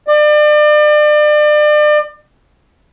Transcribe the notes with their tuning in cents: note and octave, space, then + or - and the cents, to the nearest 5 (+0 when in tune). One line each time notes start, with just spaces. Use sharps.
D5 +35